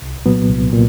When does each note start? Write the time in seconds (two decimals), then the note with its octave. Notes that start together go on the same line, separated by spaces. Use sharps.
0.02 C2
0.26 A#2 F#3 B3
0.49 C2
0.73 A#2